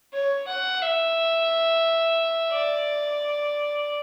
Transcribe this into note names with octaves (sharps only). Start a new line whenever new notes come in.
C#5
F#5
E5
D5